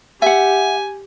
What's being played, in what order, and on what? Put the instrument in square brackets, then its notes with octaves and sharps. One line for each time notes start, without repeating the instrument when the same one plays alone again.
[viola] G4 [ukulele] E5 F#5 [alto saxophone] G#5